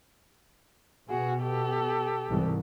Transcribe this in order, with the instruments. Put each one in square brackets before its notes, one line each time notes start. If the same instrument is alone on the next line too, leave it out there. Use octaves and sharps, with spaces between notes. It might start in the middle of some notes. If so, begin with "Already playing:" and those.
[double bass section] B2 [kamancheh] F#4 G#4
[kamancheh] G4 A4
[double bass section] C2 G#2 E3